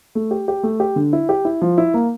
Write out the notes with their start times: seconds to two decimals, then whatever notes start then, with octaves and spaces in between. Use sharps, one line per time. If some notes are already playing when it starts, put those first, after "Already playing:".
0.15 A3
0.31 G4
0.48 G4
0.63 A3
0.80 G4
0.96 D3
1.13 E4
1.29 G4
1.45 E4
1.62 F3
1.78 E4
1.94 A#3